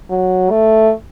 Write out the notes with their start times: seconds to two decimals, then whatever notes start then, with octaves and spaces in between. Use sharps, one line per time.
0.10 F#3
0.50 A3